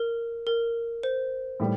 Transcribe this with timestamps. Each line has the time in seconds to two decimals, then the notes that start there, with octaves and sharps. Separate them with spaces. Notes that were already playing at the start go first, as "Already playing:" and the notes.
Already playing: A#4
0.47 A#4
1.03 C5
1.60 A2 G3